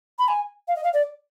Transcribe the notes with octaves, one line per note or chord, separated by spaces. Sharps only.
B5
G#5
F5
D#5
F5
D5